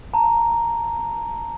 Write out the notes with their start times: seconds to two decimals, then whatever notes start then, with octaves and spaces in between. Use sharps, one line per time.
0.14 A5 A#5